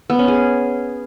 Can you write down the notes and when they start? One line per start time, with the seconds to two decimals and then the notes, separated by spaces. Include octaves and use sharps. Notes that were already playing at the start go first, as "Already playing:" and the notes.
0.10 B3
0.19 C#4
0.28 G#4